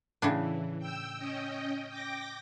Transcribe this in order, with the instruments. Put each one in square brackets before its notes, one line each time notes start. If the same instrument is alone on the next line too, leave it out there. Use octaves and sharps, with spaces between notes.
[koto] A2 C#3 D4 [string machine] E3
[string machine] G5 E6
C#4 D#5 G5
G5 D6 A#6